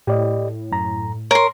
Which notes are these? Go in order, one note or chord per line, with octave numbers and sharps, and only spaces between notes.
A2 G4 D5 D#5
F#2 A#5
A#4 C#5 C6